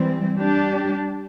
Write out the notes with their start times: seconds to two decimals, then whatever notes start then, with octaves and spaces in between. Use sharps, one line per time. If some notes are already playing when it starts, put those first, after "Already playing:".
Already playing: E3 G3 C4
0.38 G3 D4 G4